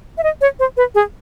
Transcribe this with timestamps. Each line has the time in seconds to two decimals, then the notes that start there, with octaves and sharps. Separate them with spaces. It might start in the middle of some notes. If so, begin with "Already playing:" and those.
0.18 E5
0.23 D#5
0.41 C#5
0.60 C5
0.77 B4
0.95 G#4